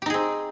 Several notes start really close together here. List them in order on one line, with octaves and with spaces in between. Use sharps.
G4 D#4 G#4 C4